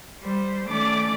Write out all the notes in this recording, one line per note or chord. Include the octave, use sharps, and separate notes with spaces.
G3 C5
D#3 A3 C#4 D5 D6